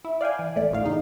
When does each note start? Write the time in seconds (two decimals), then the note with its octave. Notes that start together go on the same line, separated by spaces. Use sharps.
0.05 E4
0.21 D5 F5 G5 G#5
0.39 E3
0.56 A1 A3 D5
0.70 G#1 D2 A2 F5
0.84 E2 C#3 D#4